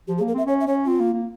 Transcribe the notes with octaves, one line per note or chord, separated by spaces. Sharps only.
F3 G4
G#4
A#3
A#4
C4 E5
C#4 C#5
E5
C#4 C#5
C4 F4
A#3
A#3